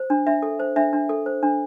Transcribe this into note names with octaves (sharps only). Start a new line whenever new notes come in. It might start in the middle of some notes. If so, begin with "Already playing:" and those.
Already playing: C5
D4
D4 E5
A4
C5
D4 E5
D4
A4
C5
D4